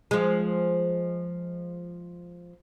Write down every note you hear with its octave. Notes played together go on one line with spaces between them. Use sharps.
F3 G#3